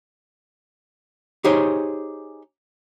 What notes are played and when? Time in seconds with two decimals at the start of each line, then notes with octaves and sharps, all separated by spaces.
1.44 D#4 G4 G#4 C5 C#5